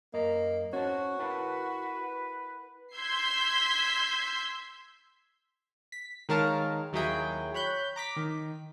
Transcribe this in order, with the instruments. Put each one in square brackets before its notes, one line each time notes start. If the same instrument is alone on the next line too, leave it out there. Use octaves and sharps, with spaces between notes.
[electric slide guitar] F#2 A#5 [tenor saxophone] A#3 [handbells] D#5
[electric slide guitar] C#4 C5 A5 [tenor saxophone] F#4 [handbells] C#5
[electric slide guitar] E4 A#4 A5 [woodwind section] B4 [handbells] F#5
[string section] C6 E6 G6 G#6 B6 C7
[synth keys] B6
D#3 G#3 A#4 C#5 F5 A5
D#2 F#3 E4 G#4 G5
C#5 B5 F#6 G6
A#5 D6 B6
D#3